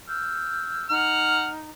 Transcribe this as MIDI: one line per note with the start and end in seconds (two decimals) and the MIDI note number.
0.08 0.86 88
0.08 0.86 89
0.08 0.86 91
0.89 1.71 63
0.89 1.48 78
0.89 1.48 89